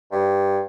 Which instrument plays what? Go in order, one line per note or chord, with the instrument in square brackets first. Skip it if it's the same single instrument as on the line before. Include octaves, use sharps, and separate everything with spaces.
[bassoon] G2